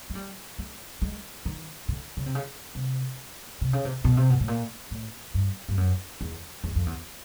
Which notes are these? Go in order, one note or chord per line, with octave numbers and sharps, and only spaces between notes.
G#3
G3
G#3
G#3
D#3
D3
C#3
C3
C#3
C3
C3
C#3
C3
B2
C3
B2
A2
A#2
A2
G2
G2
F#2
E2
E2
F2
E2